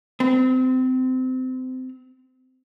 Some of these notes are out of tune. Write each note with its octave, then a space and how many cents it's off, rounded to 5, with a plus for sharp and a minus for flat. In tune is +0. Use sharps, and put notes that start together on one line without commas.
C4 -25